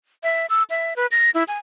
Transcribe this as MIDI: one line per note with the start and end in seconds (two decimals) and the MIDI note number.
0.23 0.46 76
0.50 0.63 88
0.70 0.94 76
0.96 1.07 71
1.12 1.30 94
1.34 1.44 64
1.48 1.58 80